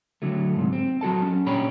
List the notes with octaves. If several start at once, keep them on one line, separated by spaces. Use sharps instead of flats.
D3 F#3 A3
G#2 C3
C4
F#3 F#4 A4 A5
C#4
A#2 D4 G4 C#5 B5